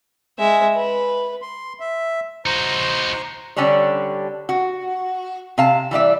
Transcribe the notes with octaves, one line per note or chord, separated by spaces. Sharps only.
G#3 E5
B4
C6
E5
D#4 F#4 C5 A#5
D3 G3 C#4 D4 C#5
F#4
C3 F5 A5
E3 G3 D5 E5